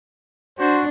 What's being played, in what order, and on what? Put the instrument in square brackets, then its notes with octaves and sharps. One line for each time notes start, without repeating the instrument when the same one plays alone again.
[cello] D4 [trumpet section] F#4 C5